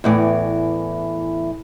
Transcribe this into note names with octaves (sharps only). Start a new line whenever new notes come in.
E2 A2 E3